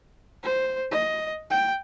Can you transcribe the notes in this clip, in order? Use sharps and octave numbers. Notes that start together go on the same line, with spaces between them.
C5
D#5
G5